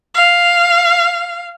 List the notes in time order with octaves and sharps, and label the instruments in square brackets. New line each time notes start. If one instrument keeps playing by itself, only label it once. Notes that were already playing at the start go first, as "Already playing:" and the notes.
[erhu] F5